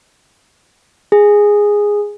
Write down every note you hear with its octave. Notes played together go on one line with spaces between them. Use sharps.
G#4